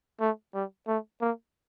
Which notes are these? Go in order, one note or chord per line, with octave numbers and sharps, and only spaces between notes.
A3
G3
A3
A#3